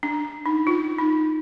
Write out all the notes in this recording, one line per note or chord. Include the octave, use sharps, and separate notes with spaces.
D4
D#4
F4
D#4